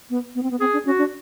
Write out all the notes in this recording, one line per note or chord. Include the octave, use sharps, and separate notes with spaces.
B3
B3
C4
B3
C4 G#4
D4
C#4 F#4
D4